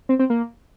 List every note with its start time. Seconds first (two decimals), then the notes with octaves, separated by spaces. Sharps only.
0.09 C4
0.19 C4
0.30 A#3